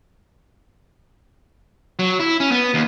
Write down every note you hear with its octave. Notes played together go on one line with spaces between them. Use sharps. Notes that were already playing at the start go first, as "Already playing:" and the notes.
F#3
E4
C#4
B3
D#2